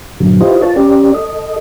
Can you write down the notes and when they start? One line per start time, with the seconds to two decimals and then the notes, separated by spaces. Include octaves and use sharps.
0.20 G2 A#2 D3 F#3
0.40 E4 F4 G4 B4 C5 D#5
0.62 F4 B4 C#5 A5
0.76 C#4 G4 D5
1.14 A4 D#5